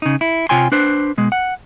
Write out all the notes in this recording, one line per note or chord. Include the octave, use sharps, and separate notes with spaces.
C#3 D#4
E4
C3 F4 C#5 G5 G#5 C6
D4 B4 C5
B2 G#3
F#5